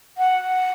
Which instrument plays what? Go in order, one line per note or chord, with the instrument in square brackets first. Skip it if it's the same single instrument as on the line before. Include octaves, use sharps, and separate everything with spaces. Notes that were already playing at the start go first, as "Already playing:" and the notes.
[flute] F#5